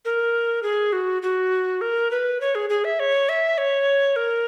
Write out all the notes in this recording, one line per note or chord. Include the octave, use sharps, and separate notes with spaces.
A#4
G#4
F#4
F#4
A#4
B4
C#5
G#4
G#4
E5
C#5
E5
C#5
A#4